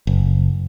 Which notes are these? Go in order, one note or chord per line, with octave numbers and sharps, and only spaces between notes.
F#1